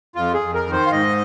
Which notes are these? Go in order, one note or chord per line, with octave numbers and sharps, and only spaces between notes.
F2 F4
G#4
F2
A#4
D#3
C5
F5
G#2 D#5